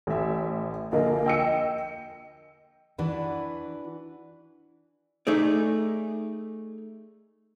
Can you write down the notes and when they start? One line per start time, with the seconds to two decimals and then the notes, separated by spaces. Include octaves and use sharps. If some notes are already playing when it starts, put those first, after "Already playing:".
0.07 A1 E5
0.92 A#1 D3 A#3 D#5
1.26 G5 E6 C#7
2.98 E3 D4 F#4 B4
5.27 A3 D#4 G#4 D5